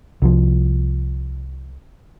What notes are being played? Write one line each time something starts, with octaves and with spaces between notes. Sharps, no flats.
C2 F3